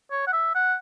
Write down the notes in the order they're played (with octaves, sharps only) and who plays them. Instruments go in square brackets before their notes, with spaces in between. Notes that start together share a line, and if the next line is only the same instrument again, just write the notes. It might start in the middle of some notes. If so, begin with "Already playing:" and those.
[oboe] C#5
F#5
E5
F#5